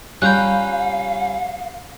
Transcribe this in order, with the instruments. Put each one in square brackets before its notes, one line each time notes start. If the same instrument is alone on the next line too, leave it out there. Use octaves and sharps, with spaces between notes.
[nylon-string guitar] G3 F4 [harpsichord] C#4 A#5 B5 [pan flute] F5 [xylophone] F#6 G6